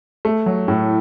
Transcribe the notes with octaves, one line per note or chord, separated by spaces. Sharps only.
A3
F#3
A2